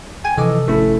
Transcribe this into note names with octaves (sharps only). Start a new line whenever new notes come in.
G5 G#5
C3 E3 F3 A4 D#5 D6
G#1 A3 C#4 E4